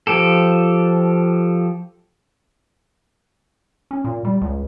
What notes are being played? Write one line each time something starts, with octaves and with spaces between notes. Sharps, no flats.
F3 G4 A4
C#4
A#2
G3
C#2